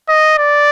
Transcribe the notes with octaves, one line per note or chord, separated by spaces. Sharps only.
D#5
D5